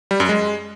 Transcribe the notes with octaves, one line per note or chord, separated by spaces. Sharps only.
G3
F#2
G#3